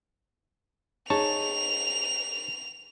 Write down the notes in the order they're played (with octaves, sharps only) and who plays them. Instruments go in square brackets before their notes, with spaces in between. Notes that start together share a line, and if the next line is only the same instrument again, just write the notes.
[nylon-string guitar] D#4 G#4 [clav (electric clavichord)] C#5 A5 [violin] F7